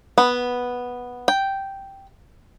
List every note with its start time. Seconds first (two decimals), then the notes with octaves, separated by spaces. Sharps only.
0.18 B3
1.28 G5